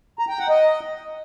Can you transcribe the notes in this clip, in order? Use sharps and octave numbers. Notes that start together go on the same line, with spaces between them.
A#5
G5
F#5
D#5